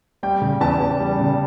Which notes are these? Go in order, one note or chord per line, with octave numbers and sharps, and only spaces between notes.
G3 G5
C#3
E2 A5
E2
G3
C#3